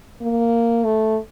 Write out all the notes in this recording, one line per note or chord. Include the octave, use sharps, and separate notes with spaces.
A#3
A3